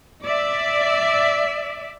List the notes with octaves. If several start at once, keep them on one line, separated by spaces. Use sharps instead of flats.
D5 E5